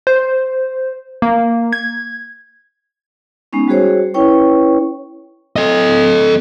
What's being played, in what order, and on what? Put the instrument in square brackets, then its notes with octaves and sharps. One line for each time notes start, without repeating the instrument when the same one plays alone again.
[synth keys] C5
A#3
G#6
[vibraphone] G#3 B3 C#4 D#4
G3 F#4 G#4 C5 C#5
C#4 E4 B4 C#5 G5 C#6
[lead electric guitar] A4 D#5